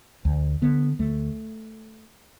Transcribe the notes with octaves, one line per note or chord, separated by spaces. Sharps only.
D2
D3 B3
D2 A3